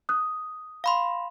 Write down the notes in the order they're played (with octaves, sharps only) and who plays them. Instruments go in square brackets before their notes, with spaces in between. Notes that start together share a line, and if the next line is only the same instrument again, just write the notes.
[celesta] D#6 F#6
[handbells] F5 B5 C6